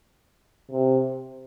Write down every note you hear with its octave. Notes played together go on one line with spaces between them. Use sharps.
C3